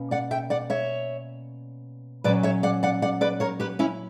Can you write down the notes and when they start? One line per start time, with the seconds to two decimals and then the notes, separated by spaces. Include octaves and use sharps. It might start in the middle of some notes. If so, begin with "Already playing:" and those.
Already playing: B2 A#3 C#4
0.11 D5 F#5
0.31 E5 G5
0.50 D5 F#5
0.70 C#5 E5
2.24 A#2 F#3 C#4 B4 D5
2.43 C#5 E5
2.63 D5 F#5
2.83 D5 F#5
3.02 D5 F#5
3.21 B4 D5
3.40 A#4 C#5
3.60 G4 B4
3.79 C#4 E4